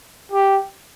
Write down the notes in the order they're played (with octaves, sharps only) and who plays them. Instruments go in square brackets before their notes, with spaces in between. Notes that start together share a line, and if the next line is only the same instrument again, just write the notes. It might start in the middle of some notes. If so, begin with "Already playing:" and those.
[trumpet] G4